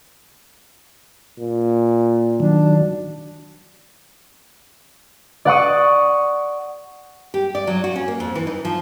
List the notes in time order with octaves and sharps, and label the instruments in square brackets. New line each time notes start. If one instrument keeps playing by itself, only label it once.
[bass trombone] A#2
[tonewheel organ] D#3 F#3 [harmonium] D4
[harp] D5 F#5 C#6 D#6
[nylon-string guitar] G4
D5
F#3
F#4
C#4
A#3
F2
E3
D#4
F3